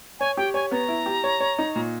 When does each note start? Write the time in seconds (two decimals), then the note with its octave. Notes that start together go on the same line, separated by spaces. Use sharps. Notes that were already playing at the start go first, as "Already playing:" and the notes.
0.20 C#5 G#5
0.37 G4 G5
0.54 C#5 G#5
0.71 B3 A#5
0.88 E4
1.06 G4
1.24 C#5
1.40 C#5
1.59 D#4
1.76 A#2